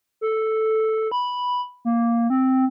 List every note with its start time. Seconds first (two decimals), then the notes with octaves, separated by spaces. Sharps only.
0.21 A4
1.12 B5
1.85 A#3
2.30 C4